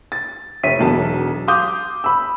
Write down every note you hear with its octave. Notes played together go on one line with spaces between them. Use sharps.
A6
F1 C#5 E5 B6 D#7
E1 B1 A5
F5 C6 D6 D#6 G6
B5 E6